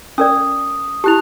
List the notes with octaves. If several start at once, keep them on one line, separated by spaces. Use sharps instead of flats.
C#4 A#4 D5 D#6
E4 G4 A5 F#6 F7